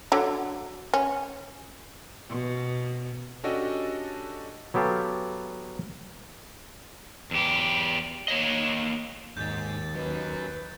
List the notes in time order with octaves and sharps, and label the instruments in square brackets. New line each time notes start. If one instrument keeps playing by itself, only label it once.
[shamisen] D3 F#3
C#4
[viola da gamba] B2
[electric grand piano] C#4 D4 F#4 G4 A4 D#5
[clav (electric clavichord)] F#3 B3 G4 A4 F5
[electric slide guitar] E2 G4
A#3 C#5 D#5
[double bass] D#2 [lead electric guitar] G#2 [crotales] G6 A6
[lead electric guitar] F#3 C#4 [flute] B4